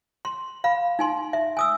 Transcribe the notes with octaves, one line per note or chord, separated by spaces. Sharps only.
C6
F5 B5
D#4 G#5 C6
E5
G#5 D#6 E6